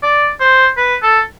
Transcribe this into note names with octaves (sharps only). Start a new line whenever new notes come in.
D5
C5
B4
A4